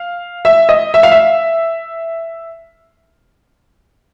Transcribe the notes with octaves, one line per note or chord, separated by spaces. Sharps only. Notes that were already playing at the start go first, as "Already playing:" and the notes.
Already playing: F5
E5
D#5
E5
F5
E5